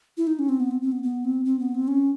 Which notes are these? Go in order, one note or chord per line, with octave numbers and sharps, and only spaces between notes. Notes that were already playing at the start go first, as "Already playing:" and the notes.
E4
D#4
C#4
C4
B3
C4
C4
B3
B3
C4
C4
B3
C4
C#4